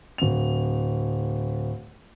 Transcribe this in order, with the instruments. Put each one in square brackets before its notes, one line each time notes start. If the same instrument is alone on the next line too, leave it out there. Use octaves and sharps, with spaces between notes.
[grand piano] D1 F7